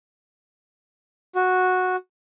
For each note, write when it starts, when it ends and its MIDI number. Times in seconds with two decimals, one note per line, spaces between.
1.35 1.96 66